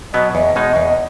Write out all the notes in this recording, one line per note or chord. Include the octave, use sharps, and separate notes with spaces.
B2 F#3 B3 D#5
E2 D#5
B2 G#3 D#4
E2